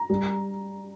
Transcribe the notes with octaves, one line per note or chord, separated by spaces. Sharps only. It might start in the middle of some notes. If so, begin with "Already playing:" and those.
Already playing: A#5
G3